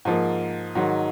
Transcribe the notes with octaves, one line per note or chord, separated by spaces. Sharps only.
G#2 F3 A#3
G#2 D#3 F#3